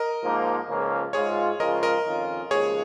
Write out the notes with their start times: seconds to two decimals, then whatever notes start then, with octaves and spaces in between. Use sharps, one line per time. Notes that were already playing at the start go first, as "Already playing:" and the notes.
Already playing: A#4 D#5
0.22 G#2 F3 A#3 D#4
0.68 C#2 C#3 F3 A#3 C#4
1.13 G#2 G#3 F4 G#4 C#5
1.60 C#3 F3 G#3 F4 A#4 D#5
1.83 A#4 D#5
2.06 F2 D#3 C#4 F4
2.51 D#2 C#3 F3 G#3 G#4 C#5